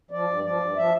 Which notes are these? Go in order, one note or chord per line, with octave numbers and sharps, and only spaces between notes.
F3 D5
G2
F3 D5
G2
F3 E5